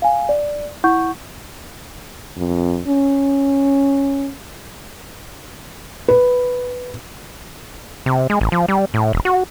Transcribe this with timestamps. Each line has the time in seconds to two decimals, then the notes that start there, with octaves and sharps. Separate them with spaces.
0.02 F5 G#5
0.29 D5
0.84 E4 F#5 C#6 G6
2.37 F2
2.88 C#4
6.08 B4
8.06 C3
8.30 G#3
8.41 A1
8.52 F3
8.68 G3
8.94 A2
9.13 E1
9.25 F#4